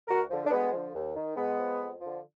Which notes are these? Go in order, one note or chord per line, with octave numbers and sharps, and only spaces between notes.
D2 F#4 A#4
D3 F3
D4
D2 G#3 B3
D3 F3
D#2
D#3
G#2 G#3 B3
F3
F2
D3 F3